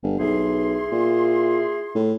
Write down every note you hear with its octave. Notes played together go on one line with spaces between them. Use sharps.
G1
B1 E4 G#4 C6
A#2
A2